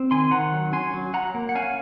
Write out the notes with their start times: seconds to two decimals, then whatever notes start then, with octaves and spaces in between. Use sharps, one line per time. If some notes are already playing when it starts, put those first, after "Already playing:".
Already playing: C4
0.11 D#3 G#5 C6
0.31 D#3 F#5 A#5
0.52 F#3
0.73 C#4 G#5 C6
0.94 F#3
1.13 F#3 F#5 A#5
1.34 A#3
1.49 F#5
1.55 C#4 F5 G#5